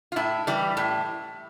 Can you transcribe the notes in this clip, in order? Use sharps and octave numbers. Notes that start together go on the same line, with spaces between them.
F4
A2 E4
E3 G3
A2